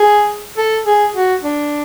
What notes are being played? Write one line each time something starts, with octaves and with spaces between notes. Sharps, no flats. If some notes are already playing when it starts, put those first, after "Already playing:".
Already playing: G#4
A4
G#4
F#4
D4